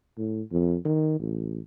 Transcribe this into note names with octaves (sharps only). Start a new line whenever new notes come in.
A2
F2
D#3
A1